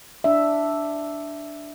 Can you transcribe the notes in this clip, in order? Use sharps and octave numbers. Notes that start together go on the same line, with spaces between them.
D4 E5